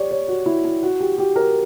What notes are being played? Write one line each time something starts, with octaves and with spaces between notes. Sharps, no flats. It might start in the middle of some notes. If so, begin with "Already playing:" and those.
Already playing: G4 C#5 D5
C#5
F#4
E4
E4
F#4
G4
G4
A#4